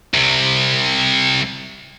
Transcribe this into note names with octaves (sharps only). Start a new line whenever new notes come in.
C2 C3